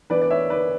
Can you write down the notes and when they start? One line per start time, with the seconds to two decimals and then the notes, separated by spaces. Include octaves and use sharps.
0.10 E3 B3 D4 B4 D5
0.22 D5
0.30 C#5 E5
0.50 B4 D5